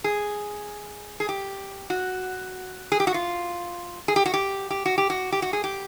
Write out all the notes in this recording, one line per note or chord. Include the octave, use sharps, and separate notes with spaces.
G#4
G#4
G4
F#4
G#4
G4
F#4
F4
G#4
G4
F#4
G4
G4
F#4
G4
F#4
G4
F#4
G#4
G4